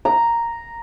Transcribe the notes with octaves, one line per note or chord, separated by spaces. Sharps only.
A#5